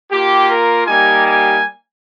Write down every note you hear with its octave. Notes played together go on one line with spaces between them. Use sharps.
A#3 F4 G4
A#4
G3 A#3 D#4 G4 G#5
G#5